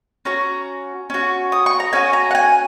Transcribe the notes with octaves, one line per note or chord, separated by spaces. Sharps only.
C#4 F#4 A#5
C#4 F#4
D#6
C#6
A#5
C#4 F#4 G#5
A#5
F#5
G#5